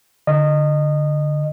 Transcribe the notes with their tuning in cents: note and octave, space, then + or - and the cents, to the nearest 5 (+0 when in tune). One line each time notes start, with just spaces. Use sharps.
D3 +0 D#5 -20